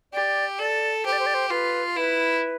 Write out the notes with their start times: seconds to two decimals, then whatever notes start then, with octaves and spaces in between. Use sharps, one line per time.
0.13 G4 D5
0.59 A4 D5
1.05 G4 C5
1.12 D5
1.19 C5
1.26 D5
1.34 C5
1.51 F4 B4
1.96 E4 B4